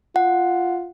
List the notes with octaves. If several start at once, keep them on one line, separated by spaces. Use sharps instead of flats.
F4 F#5